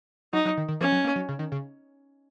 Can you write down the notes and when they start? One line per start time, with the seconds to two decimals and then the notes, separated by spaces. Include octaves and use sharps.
0.33 F#3 D#4
0.45 F#3
0.57 D#3
0.68 D#3
0.81 F3 C#4
0.92 F#3
1.04 A#3
1.16 F#3
1.28 C#3
1.39 D#3
1.52 C#3